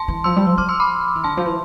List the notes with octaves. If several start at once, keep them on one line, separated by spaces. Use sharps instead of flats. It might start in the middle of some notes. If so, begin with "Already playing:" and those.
Already playing: A5 C6
E3
F3 C6 E6
G3
F3
F3 D6 F6
C6 E6
B5 D6
E3
D3 A5 C6
F3
E3